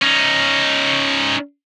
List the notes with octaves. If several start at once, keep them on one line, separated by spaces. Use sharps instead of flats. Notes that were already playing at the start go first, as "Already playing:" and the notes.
C#4 D#4